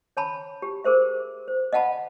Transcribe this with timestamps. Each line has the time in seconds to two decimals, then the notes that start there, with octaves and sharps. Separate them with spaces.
0.17 C#5 A5 B5
0.62 G4
0.84 G#4 A#4 C5 E5
1.48 C5
1.73 D#5 F5 F#5 A5 B5